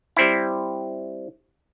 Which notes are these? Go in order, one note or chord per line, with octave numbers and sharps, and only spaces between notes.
G3 C4 E4